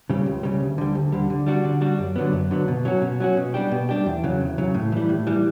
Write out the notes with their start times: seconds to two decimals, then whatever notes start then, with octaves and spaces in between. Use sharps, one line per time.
0.10 C#3 G3
0.26 C#2
0.43 C#3 G3
0.61 D2
0.78 D3 G3
0.95 D2
1.12 D3 G3
1.30 D3
1.47 G3 D4 F#4
1.65 D3
1.81 G3 D4 F#4
1.99 F#2
2.16 D3 F#3 B3
2.33 F#2
2.51 D3 F#3 B3
2.68 B2
2.85 F#3 C#4 F#4
3.02 B2
3.20 F#3 C#4 F#4
3.37 B2
3.54 G3 D4 G4
3.72 B2
3.89 G3 D4 G4
4.06 E2
4.24 C#3 F#3
4.41 E2
4.58 C#3 F#3
4.74 A2
4.92 E3 G3
5.09 A2
5.27 E3 G3